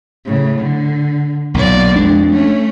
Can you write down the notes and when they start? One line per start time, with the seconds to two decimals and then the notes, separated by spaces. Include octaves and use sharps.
0.26 A2 C#3
0.59 D3
1.54 B1 A#2 A#3 D5
1.96 F2 G#3 D4
2.33 A3 C#4